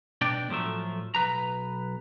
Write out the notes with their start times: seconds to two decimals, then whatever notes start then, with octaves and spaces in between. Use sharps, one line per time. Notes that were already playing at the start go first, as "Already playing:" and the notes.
0.21 B2 D4 D5 G5
0.49 A2 F3 F#3 A3 E5
1.15 B1 B2 B4 A#5